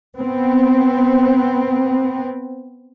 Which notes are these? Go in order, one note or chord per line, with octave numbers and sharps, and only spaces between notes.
B3 C4